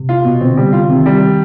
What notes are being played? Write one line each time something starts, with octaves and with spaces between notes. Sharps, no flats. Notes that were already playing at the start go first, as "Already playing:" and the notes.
Already playing: C3
F4
B2
D3 C4
G3
F4
C3 D#3
G3